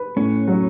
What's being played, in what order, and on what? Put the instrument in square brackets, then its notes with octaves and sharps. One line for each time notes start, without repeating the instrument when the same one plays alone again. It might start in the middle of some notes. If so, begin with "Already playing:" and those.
Already playing: [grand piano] B4
[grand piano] A2 [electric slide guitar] C#4
[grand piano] F#3